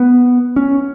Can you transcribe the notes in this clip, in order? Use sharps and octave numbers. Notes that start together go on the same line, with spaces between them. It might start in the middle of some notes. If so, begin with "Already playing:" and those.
Already playing: B3
C#4